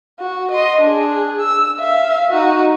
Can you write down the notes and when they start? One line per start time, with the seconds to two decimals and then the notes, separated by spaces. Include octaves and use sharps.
0.19 F#4
0.51 D#5 C6
0.81 D4 G#4
1.41 E6
1.79 E5 F5
2.31 D#4 F#4